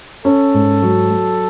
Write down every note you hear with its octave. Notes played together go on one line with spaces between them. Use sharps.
C#4 A4
G#2
F#3
F#3